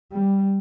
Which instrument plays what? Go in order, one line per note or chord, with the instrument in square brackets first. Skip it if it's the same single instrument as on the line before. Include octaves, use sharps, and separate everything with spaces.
[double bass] G3